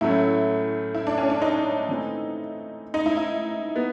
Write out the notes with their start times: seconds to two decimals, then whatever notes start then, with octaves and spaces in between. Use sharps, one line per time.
0.01 A2 F#3 A3 C#4 E4
0.95 E4
1.07 D4
1.18 C#4
1.30 D4
1.42 D#4
1.89 E3 A3 C4 E4
2.94 D#4
3.06 E4
3.17 E4
3.76 B3